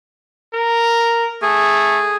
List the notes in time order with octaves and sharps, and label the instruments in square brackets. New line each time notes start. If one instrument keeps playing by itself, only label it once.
[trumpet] A#4
[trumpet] A3 [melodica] G#4